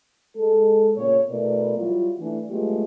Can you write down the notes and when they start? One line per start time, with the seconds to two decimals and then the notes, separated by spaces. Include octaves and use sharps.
0.37 G#3 A4
0.96 A#2 C#3 B3 C#5
1.30 B2 A3 E4 A#4 B4 D5
1.78 F#3 G3 E4 F4
2.19 E3 A3 D4
2.49 F#3 G#3 A3 B3 F4 G4